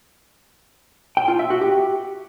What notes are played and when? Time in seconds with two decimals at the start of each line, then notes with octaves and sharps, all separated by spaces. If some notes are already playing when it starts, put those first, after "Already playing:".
1.17 G5
1.28 F4
1.39 E5
1.50 F#4
1.61 G4